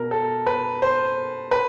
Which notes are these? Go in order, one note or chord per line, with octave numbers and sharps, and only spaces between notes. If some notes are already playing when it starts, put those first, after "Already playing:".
Already playing: B2 A#4
A4
B4
C5
B4